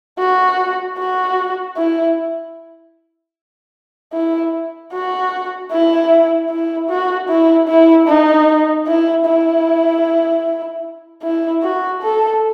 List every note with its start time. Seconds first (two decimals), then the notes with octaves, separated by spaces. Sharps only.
0.19 F#4
0.98 F#4
1.77 E4
4.13 E4
4.93 F#4
5.72 E4
6.50 E4
6.89 F#4
7.29 E4
7.68 E4
8.08 D#4
8.87 E4
9.26 E4
11.23 E4
11.63 F#4
12.02 A4